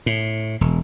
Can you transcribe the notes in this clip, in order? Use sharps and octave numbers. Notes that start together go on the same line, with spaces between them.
A2
E1